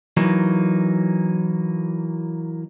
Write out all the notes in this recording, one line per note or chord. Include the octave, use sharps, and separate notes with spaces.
E3 F#3 A#3 D#4